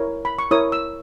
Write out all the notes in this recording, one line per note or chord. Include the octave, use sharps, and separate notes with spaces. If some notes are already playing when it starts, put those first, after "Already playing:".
Already playing: E4 A#4 C#5
B5
C#6
E4 A#4 C#5 D#6
E6